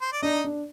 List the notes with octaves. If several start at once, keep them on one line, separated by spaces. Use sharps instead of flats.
C5
D5
D4 D#4 D#5
D4